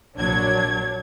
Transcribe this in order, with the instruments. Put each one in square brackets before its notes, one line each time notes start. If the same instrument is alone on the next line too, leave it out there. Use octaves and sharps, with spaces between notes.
[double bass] A#1 F#3 [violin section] D4 C#5 G#6